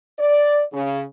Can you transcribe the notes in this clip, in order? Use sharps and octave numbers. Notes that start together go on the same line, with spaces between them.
D5
C#3